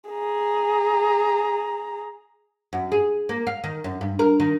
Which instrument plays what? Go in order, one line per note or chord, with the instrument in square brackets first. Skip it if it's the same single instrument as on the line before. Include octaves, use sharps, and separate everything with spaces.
[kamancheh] G#4 A#5
[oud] F#2
G#4
A#3
F5
D#3
F#2
G2
A#4
D#3